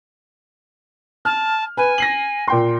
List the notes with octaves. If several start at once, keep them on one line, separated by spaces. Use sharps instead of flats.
A5 F6
B4 G#5
A#6 C7 F#7
A#2 G5 C6